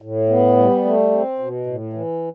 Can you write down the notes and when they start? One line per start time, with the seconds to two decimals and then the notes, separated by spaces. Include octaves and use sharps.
0.02 A2
0.29 B3
0.57 G3
0.85 A3
1.11 C4
1.39 B2
1.66 A2
1.93 E3